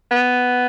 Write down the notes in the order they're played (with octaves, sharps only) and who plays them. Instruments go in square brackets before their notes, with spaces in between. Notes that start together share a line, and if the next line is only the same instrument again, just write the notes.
[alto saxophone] B3